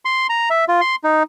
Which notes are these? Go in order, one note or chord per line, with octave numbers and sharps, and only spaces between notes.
C6
A#5
E5
F4
C6
D#4